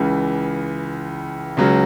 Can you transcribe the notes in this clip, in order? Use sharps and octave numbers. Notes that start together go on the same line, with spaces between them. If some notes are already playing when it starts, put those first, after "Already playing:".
Already playing: C#2 C#3 E3
C#2 C#3 F#3